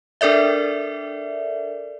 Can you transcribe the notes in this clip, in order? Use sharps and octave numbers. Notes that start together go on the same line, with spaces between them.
D4 A4 A#4 D5 E5